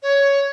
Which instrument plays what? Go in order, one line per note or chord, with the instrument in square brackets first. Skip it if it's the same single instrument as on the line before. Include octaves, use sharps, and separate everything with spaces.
[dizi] C#5